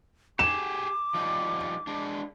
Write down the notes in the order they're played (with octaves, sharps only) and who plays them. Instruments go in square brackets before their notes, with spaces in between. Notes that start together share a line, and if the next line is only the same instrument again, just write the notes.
[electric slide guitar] G4 G#4 [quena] D6 [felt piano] E7
[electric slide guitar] F3 G3 D#4
G#3 D4